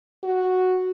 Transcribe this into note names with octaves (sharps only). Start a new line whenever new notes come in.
F#4